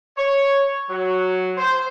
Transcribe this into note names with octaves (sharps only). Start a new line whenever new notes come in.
C#5
F#3
C5